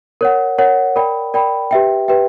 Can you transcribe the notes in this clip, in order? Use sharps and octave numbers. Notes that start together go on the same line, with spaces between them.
A#4 C#5 F#5
A#4 C#5 F#5
A#4 D5 G5 B5
A#4 D5 G5 B5
G4 B4 E5 G5
G4 B4 E5 G5